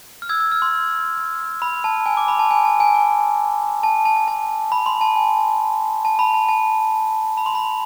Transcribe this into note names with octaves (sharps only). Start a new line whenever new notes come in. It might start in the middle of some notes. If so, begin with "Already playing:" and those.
F6
E6 G#6
E6 G#6
F6
C6
B5
A5
G#5
D6
B5
A5
G#5
A5
G#5
G#5
A5
A5
A5
A5
B5
C6
A5
G#5
A5
B5
A5
A5
B5
C6
B5